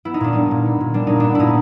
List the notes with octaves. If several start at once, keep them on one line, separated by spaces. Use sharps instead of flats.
B3 E4
D#4
A#2 D4
G3 D#4
A#2
B3
A#2
G3 D4
A#2 D#4
B3 D4
A#2 D#4 E4